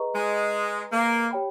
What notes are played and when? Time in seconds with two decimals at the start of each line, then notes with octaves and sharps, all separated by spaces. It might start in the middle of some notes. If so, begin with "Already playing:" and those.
Already playing: G#4 B4 D#5 A#5 C#6
0.15 G#3
0.92 A#3
1.31 G4 C#5 G5 B5